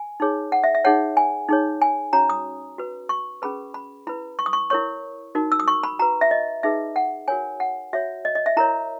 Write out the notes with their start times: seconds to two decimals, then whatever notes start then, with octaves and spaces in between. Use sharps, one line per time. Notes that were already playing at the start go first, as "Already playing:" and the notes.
Already playing: G#5
0.20 D#4 G#4 C#5
0.52 F#5
0.64 E5
0.75 E5
0.84 D#4 G#4 C#5 F#5
1.17 G#5
1.49 D#4 G#4 C#5
1.82 G#5
2.13 C#4 F#4 C#5 A#5
2.30 D#6
2.78 F#4 B4
3.09 C#6
3.42 C#4 G#4 B4 B5
3.74 B5
4.07 E4 B4 B5
4.39 C#6
4.46 D#6
4.53 C#6
4.70 E4 A#4 C#5 C#6
5.35 D#4 F#4 A#4
5.52 E6
5.60 D#6
5.68 C#6
5.83 B5
5.99 F#4 B4 A#5
6.21 E5
6.31 D#5
6.63 D#4 G#4 B4 E5
6.96 F#5
7.28 F#4 A#4 C#5 G#5
7.60 F#5
7.93 F#4 C#5 E5
8.25 D#5
8.35 D#5
8.46 E5
8.57 E4 A#4 C#5 A#5